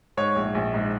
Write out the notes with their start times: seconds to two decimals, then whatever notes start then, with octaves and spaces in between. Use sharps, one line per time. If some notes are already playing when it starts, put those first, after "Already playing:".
0.17 G#2 C#5
0.36 A#1
0.55 A#1
0.74 G#2